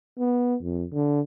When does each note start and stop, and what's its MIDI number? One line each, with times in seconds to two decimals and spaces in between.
0.18 0.55 59
0.62 0.85 41
0.92 1.21 50